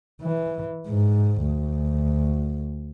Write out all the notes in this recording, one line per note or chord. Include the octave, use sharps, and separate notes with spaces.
E3
G#2
D2